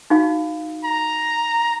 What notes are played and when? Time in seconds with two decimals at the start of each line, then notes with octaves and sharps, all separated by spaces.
0.10 D#4 F#4 F5
0.84 A#5